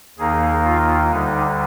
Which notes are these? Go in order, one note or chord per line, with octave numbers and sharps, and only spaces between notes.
D#2 D#3 A#3 D#4 G#4
F4
D2 D3 G3 D#4